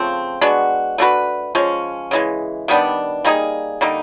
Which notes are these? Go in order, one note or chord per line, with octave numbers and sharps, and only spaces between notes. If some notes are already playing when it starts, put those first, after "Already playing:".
Already playing: C#3 F3 A3 C4
G#3 B3 D4 F#4
A3 D4 F#4 B4
F3 G#3 C#4
C#3 E3 G#3
D#3 G3 B3 D4
G3 A#3 D#4 G#4
D3 G3 A#3 D#4